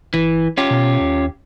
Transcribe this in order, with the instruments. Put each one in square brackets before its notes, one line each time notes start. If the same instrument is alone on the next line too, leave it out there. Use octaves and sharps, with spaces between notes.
[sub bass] G1 [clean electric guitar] E3
[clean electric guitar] C#4 F4 G4
[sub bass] B2
D#2